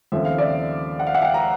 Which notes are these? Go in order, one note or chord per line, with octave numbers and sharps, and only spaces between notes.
D#2 C#3 F3 A3 C4 E5
F5
D5 E5
F#5
F5
E5 F#5
F5 G5
A#5